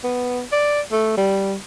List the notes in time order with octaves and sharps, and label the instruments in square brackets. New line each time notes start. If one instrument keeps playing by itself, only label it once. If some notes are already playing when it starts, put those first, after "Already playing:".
[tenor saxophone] B3
D5
A3
G3